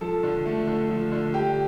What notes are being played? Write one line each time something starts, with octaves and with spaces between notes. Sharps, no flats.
F3 A4
D3
A3
D3
F3
D3
G3 G4